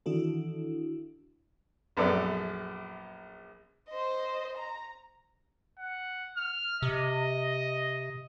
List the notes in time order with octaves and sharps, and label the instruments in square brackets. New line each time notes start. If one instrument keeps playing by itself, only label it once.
[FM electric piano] D#3 E3 D4 E4 F#4 A4
[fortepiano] A#1 F#2 B3 A4 B4 D5
[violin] C5 D#5
A#5
[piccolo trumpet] F#5
F6
[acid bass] C3 [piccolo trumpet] D#5